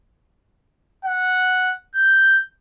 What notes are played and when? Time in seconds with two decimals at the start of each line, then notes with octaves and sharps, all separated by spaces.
1.05 F#5
1.95 G6